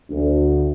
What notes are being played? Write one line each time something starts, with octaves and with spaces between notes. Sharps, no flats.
D2